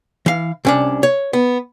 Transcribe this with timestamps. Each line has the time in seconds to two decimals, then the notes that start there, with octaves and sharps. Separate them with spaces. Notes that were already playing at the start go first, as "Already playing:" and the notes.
0.26 E3 F5
0.65 C2 C#4 D4
1.03 C#5
1.33 B3